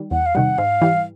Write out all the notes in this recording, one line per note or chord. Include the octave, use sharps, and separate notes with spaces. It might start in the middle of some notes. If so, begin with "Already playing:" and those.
Already playing: D#3 G3
E2 F#5
F5
C3 D#3 G3 F#5
G#2 F5
E3 G3